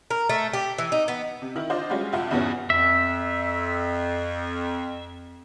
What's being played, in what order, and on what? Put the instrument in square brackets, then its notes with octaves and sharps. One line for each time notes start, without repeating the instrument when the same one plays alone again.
[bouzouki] A#4
A3
G4
E3
D#4
B3
[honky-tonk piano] C3
D#3 E4
D4 F4 C5 D5 D#5
G3 G#3 C#4 F4 F#4
F2 C3 F4 E5 F#5
E2 G2 B2 E3 B3 C#4
[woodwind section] F2 [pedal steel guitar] E5